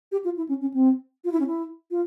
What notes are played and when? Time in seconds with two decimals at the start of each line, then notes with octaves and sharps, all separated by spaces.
0.12 G4
0.24 F4
0.37 E4
0.49 C#4
0.61 C#4
0.74 C4
1.24 F4
1.32 E4
1.40 C#4
1.47 E4
1.91 F4